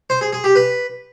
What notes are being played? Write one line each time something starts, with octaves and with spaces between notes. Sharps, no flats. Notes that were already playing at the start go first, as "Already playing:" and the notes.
C5
G#4
G#4
G4
B4